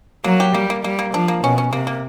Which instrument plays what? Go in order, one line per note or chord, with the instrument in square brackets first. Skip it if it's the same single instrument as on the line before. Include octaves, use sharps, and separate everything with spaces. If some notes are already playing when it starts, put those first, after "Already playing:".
[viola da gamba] F#3 [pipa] A#3
[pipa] G4
[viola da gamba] G3 [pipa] A#3
[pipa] A#3
[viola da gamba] G3 [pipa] A#3
[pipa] A#3
[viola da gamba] F3 [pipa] D4
[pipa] A#3
[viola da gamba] B2 [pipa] C#4
[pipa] C#4
[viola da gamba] C3 [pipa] A#3
[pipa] A#3